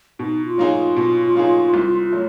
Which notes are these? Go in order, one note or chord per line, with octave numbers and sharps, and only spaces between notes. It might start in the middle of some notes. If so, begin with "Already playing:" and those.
B2 D#4
F4
F#3 A#3 D#4 G#4
F4
B2
F#3 A#3 D#4 G#4
C2
F#3 A3